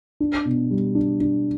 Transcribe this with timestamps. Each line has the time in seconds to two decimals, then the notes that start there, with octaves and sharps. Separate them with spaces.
0.20 D4
0.45 B2
0.71 G3
0.95 D4
1.21 D4